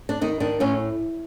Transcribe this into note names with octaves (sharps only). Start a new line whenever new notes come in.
D4
D#3 D#4
D#3 D4
A2 C#4